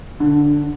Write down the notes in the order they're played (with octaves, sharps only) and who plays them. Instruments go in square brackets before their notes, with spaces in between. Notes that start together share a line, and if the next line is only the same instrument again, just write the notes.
[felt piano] D3